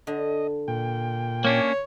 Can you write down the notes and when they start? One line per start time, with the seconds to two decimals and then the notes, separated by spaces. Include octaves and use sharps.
0.07 D3 D#5
0.68 A#2 G5
1.45 A#3 C#4 D4 C#5